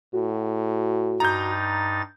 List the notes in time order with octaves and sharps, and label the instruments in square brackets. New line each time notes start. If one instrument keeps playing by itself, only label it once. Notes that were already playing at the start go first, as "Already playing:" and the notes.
[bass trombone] A2 [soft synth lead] F#4
[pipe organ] G2 D#4 A6 [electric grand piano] A#5 G6